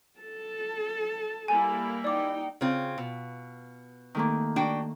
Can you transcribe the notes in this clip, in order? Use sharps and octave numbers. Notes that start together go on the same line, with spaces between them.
A4 A5
G3 A#3 E4 G#5
D#4 D5 G5 D6
C#3 C4 F4
B2
D#3 A3 A#3
D4 F#4 G5